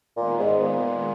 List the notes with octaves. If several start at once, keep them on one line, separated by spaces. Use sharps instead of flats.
A#2 D#3 G#3 B3
G#2
A#2